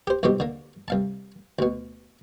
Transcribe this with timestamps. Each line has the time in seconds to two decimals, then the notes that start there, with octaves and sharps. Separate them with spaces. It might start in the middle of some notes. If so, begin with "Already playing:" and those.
0.07 G4 C5
0.23 C2 F2 G#2 B2 C4 G4
0.40 D3 A#3
0.88 C2 F5 A5
1.59 D2 B2